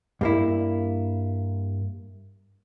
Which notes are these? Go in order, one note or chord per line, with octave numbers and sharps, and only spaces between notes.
G2 A#3 E4